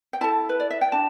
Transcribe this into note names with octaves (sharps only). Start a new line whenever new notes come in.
G5
E4 A4 A5
B4
D5
E5
G5
D4 A5